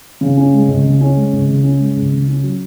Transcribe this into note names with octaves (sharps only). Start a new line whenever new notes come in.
C#3
C#4
G#3
C#2
C#3
C#4
G#3
C#2
C#3
C#4
G#3
C#2
C#3
C#4
F#3